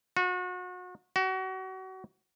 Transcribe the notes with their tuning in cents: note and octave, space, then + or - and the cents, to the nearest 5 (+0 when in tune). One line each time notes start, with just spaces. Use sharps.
F#4 -35
F#4 +30